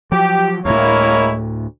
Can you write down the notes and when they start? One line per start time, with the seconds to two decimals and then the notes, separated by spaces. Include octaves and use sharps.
0.12 F3 F#3 G4
0.65 D2 A2 G#3 A#3 E4 C#5